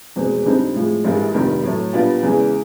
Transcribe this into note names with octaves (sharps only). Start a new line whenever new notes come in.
F1 E2 B2 G#3 C4
F2 D3 G3 C4 D#4
A2 F3 G#3
A#1 G#2 E3 G3 A#3
F1 F2 C3 D#3 G3
A2 F#3 A3
A#2 G3 B3 D4 F4
E2 C#3 E3 G#3